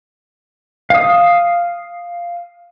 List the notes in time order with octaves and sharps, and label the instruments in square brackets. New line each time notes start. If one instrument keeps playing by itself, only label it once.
[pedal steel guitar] F5 D#6